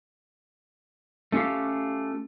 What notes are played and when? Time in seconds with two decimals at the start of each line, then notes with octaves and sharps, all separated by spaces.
1.32 A3 C#4 F4 G4 F5